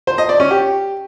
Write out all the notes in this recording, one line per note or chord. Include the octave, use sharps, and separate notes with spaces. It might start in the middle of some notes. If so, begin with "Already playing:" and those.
C5
D#5
D5
C#4
G4